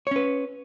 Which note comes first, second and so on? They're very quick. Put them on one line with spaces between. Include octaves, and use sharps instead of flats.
C#5 C#4 B4